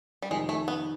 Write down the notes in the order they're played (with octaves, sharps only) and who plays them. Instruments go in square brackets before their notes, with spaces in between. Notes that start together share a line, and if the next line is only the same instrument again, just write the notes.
[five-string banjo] G3
[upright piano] F2 C3 D#3 [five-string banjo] G#3
[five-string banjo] A3
B3